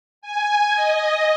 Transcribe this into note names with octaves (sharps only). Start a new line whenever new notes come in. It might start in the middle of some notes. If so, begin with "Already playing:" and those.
G#5
D#5